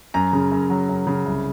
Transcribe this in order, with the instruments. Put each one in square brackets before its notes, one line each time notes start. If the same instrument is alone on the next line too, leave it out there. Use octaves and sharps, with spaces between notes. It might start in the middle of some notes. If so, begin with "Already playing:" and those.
[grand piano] F#2 A#5
C#3
F#2
F#3
F#2
C#3
C2